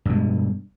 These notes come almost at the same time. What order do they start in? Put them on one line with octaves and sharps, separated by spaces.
G2 B2 G#3